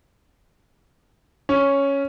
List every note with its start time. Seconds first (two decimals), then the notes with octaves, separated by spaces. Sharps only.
1.49 C#4